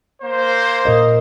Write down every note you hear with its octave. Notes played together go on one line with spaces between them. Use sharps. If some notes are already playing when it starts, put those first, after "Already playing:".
A#3 C5
A#2 A#4 D#5